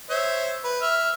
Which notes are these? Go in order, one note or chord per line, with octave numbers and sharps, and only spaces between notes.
C5 C#5 E5
B4
E5 F6